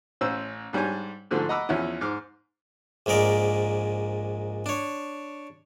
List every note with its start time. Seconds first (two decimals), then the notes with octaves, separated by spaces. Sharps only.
0.21 A1 C#4 C5 E6
0.73 G#2 G3 D4 C#5 G#5
1.31 G#2 D3 F3 A3
1.49 D#5 F#5 A#5 B5 D6 E6
1.69 E2 F3 C#4 E4
2.01 G#2 D6 F6
3.06 A#1 G#2 G#3 A#4 D5
4.66 D4 C#5